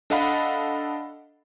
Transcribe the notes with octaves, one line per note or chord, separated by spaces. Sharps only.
D4 A4 D#5 F5 F#5 B5